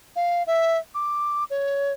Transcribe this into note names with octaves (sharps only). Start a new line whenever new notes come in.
F5
E5
D6
C#5